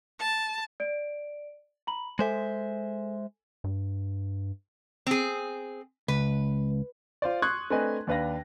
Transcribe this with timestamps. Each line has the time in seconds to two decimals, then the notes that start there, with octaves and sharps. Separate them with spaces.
0.19 A5
0.80 D5 D7
1.87 A#5 B5 F#7
2.19 G#3 A4 C5 E5 G#5
3.64 G2
5.07 C4 G#4
6.08 C#2 B4
7.22 F4 C5 D5
7.42 C6 C#6 D#6 F#6 G#6
7.70 A3 C4 D4 B4 D#5 G#5
8.07 D#2 D4 B4 F5 A#6